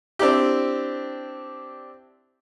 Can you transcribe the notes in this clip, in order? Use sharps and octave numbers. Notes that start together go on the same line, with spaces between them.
C4 D4 E4 G4